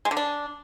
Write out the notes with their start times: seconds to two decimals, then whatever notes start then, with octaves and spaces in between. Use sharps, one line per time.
0.05 G#3
0.11 D3
0.17 D4